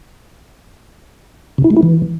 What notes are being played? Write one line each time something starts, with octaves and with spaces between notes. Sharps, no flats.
C3
E4
G#3
E4
E3